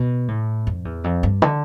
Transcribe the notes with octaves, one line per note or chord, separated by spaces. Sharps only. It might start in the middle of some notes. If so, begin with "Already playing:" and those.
Already playing: B2
A2
F2
E2
F2
G2
D3